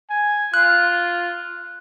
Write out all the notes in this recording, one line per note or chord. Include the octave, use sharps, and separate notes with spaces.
G#5
F4 F#6